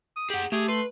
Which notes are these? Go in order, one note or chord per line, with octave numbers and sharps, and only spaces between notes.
D#6
G4 G#4 F#5
A3 G4 G#4
B4 C6